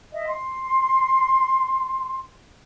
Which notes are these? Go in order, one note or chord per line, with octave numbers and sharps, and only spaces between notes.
D#5 E5
C6